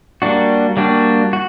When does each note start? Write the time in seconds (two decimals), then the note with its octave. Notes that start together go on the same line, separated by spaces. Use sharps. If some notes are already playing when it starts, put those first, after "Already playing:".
0.22 G3 A#3 D4 F#4
0.77 G3 A#3 D4 F#4
1.33 F#4